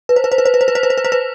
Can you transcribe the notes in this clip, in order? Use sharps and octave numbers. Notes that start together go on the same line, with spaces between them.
B4
C5
B4
C5
B4
C5
B4
C5
B4
C5
B4
C5
B4
C5
B4